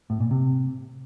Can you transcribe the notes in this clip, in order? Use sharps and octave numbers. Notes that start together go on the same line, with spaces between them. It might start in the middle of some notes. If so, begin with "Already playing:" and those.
A2
A#2
C3